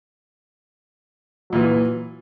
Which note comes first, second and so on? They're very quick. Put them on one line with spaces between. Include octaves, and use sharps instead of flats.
F#3 A#2 E3